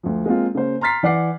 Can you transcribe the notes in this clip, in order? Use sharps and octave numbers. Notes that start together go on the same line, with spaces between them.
D2 F3
G#3 A#3 C4 F4
C#3 A#3 C5
A#5 C6 F6 A6 B6 C7
E3 D5 F#5 D6 C7